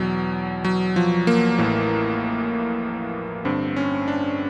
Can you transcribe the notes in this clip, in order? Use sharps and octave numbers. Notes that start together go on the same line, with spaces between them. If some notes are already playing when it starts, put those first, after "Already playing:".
Already playing: E2 B2 F#3
F#3
F3
A#3
A1 A2 E3
G1 G2 D3 C4
C#4
D4